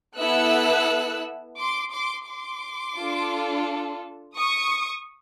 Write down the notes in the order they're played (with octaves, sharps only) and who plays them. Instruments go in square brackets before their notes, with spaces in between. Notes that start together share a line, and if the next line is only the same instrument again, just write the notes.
[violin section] B3 E4 A4 E6 F#6
C6 D6
C6 D6
C6 D6
D4 F4 A4
C#6 D#6